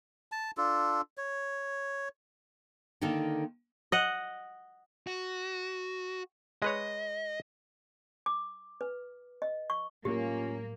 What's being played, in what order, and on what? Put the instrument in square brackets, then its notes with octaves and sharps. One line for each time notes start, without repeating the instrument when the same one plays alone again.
[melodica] A5
D4 F4 A4
C#5
[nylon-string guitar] D3 D#3 A#3 D#4 A4
[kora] D#5 F#5
[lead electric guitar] F#4
[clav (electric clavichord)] G#3 B4 C#5 [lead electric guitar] D#5
[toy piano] D6
B4
D#5
C#6
[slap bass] A2 F#3 G3 [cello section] A#3 [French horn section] C#4 F4 [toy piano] G4